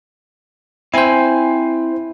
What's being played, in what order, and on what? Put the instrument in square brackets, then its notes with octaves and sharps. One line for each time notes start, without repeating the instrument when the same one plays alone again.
[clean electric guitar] C4 G#5 [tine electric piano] E4 C5